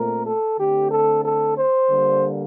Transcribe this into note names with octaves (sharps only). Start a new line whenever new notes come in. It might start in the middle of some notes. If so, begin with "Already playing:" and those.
Already playing: A#2 A3 C4 A#4
A4
D3 A3 C4 G4
A4
A4
C5
D3 G3 A#3